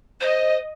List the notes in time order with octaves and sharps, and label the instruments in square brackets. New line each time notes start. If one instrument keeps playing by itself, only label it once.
[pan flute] C5 [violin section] D#5